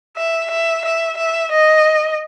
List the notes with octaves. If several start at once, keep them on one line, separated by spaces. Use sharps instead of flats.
E5
E5
E5
E5
D#5